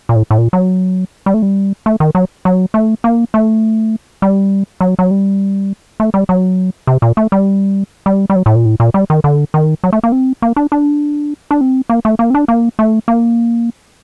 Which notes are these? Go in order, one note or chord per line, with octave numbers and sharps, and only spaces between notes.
A#2
A2
A2
A#2
F#3
G3
A3
G3
A3
D#3
F#3
F#3
A3
A#3
A3
G3
F#3
F#3
G3
A3
G3
F#3
C3
A#2
A3
G3
G3
G3
F#3
A2
A#2
A2
A#2
G3
D#3
D3
D#3
F#3
A3
A#3
C4
A#3
D4
D4
D4
C4
A#3
A3
A#3
C4
D4
A#3
A3
A#3